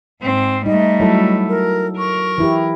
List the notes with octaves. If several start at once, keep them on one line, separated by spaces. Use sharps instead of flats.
G#2 C4
G3 A3 D#4 D#5
F#3 E4 A4
A#4
A#4 C#6
E3 E4 G4